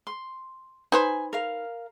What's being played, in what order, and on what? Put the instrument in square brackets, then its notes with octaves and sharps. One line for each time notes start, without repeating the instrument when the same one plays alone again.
[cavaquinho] C6
[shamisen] D#4 B4 C5 [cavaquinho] G#5
[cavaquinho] A#4 F5